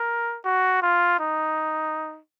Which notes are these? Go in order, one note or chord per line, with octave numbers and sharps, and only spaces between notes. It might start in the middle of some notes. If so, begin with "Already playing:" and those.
Already playing: A#4
F#4
F4
D#4